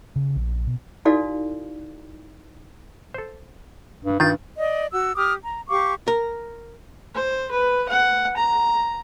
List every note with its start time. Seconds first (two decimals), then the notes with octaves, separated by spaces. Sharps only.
0.16 C#3
0.36 A#1
0.67 B2
1.05 D#4 E4 F#4 A4 D5 F5
3.14 A4 C5
4.05 G2
4.20 G2 D#3 F4 G6 A6
4.57 D5 D#5
4.92 F#4 E6
5.16 G4 D6 D#6 F6
5.44 A#5
5.70 G4 F5 C#6 D6
6.08 A#4
7.15 C5
7.51 B4
7.89 F#5
8.37 A#5